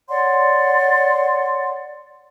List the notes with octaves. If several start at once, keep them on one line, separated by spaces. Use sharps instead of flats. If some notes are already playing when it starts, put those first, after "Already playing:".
C#5 D5 F#5 C6